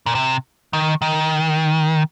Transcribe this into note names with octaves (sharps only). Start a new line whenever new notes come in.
A#2
C3
D#3
D#3